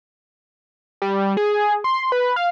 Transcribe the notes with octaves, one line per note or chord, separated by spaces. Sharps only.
G3
G#4
C6
B4
F5